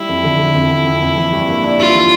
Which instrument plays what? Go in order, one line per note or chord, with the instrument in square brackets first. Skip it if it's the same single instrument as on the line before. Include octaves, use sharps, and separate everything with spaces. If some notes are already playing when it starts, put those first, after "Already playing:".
Already playing: [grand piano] G3 [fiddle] E4
[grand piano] F2
D3
D3
F2
F2
F2
F2
E3
G2
A#3
D4
[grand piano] G2 [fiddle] F4
[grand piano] E3